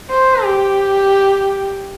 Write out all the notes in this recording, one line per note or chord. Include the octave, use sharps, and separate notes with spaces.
C5
G4